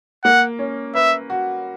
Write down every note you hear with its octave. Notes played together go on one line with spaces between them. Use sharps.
A#3 F#5
C#4
B4 E5
F#4